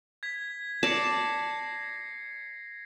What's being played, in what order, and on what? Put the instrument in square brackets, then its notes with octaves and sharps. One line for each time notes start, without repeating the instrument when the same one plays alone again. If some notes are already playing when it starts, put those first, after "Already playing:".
[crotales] G#6 B6
[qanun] D5 A5 [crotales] A#6 C7 C#7